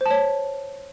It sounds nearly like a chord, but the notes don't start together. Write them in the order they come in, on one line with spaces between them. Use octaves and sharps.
C5 A5 C#5